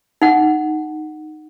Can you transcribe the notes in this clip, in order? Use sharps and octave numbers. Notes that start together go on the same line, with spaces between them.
D#4 F#5